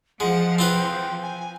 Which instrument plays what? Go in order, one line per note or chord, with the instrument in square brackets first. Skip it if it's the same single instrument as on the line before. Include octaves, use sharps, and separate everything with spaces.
[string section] F3 [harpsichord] G#3 [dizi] F#5
[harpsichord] C4 F4 B4 [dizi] G5
[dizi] G#5